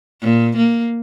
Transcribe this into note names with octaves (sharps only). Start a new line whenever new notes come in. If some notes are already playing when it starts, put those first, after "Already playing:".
A#2
A#3